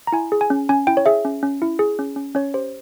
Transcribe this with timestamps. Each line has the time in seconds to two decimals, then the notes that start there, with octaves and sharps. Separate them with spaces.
0.07 A#5
0.12 E4 G#5
0.32 G#4
0.41 G#5
0.50 C#4
0.69 C#4 G#5
0.87 E4 G5
0.97 C#5
1.06 G#4 E5
1.25 C#4
1.43 C#4
1.62 E4
1.79 G#4
1.99 C#4
2.16 C#4
2.35 C#4 C#5
2.54 G4 C5